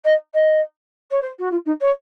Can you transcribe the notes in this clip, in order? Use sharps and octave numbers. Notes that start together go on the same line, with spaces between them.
D#5
D#5
C#5
C5
F#4
F4
D#4
C#5